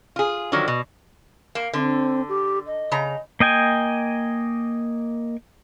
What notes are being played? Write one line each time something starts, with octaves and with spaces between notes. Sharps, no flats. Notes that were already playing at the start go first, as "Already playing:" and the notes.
F4 G#4
D3 D#3 F3 F#3
B2
A#3
D3 C4
G4
D#5
C#3 A#5
A#3 D#5 G5 G#5